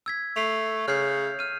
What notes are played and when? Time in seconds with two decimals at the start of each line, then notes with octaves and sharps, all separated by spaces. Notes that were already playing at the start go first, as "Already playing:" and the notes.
0.06 E6 G#6 B6
0.36 A3 C7 F7
0.88 C#3 F6 G6 C7
1.39 F6 D#7